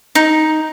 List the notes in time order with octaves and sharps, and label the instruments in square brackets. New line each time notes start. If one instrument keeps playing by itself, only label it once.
[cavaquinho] D#4